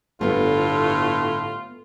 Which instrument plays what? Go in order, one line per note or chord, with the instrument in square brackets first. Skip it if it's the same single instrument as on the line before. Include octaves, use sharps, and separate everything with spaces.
[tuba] G1 [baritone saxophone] A2 [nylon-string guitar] A3 B3 [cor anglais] F4